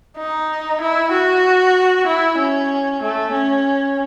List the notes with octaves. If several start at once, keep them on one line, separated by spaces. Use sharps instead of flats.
D#4
E4
F#4
E4
C#4
A3
C#4